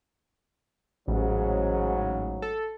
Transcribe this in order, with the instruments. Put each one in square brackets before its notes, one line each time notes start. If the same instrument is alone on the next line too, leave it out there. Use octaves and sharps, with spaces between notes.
[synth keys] A1 [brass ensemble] G#2 C#3 F#3
[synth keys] A4